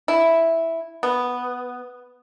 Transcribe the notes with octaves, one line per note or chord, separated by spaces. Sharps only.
E4
B3